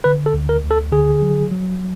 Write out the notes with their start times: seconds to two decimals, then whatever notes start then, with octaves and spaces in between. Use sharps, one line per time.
0.04 D3 B4
0.26 A4
0.33 D2
0.49 A#4
0.63 D2
0.71 A4
0.92 D3 G#4
1.22 F#3
1.51 F#3